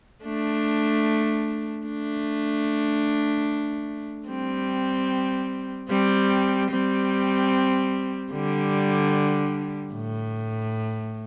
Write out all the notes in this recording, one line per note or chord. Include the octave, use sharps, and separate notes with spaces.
A3 D4
A3 D4
G3 C4
G3 C4
G3 C4
D3 G3
A2